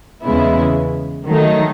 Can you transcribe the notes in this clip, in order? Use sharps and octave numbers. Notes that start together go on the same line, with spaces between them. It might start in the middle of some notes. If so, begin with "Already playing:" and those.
E2 C#3 G#3 B3 E4
D#3 F#3 A3 D#4